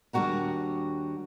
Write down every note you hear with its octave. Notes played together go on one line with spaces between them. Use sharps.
D#2 G3 D4 F#4 F#5 A#5